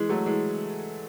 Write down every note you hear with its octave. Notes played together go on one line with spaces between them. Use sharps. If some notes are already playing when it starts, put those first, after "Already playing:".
Already playing: E3 G#3
F#3 A3
E3 G#3